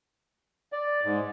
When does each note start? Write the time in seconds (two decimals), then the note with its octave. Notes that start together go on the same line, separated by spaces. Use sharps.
0.72 D5
1.04 G#2